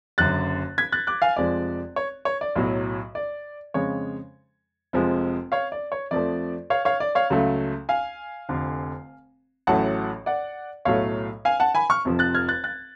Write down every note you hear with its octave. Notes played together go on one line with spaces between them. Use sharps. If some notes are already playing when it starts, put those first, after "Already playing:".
F#1 F#2 D3 F#6 A6
G#6 B6
F#6 A6
D6 F#6
F5 G#5
F1 F2 F3 G#3 D5
C#5
C#5
D5
B1 A2 F#3
D5
F2 C#3 G#3 C#5
F1 F2 F3 G#3
C#5 F5
D5
C#5
F2 F3 A3 D5
C#5 F5
C#5 F5
D5
C#5 F5
C#2 C#3 F#3 A3
F5 G#5
F1 F2 D3
A1 A2 F#3 A3 F#5 A5
D5 F#5
B1 A2 F#3 A3 C#5 F5
F5 G#5
F#5 A5
G#5 B5
C#6 F6
F1 F2 F3
F#6 A6
F6 G#6
F#6 A6
F#6 A6